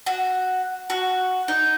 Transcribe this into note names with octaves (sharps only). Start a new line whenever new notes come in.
F#4
F#4
D#4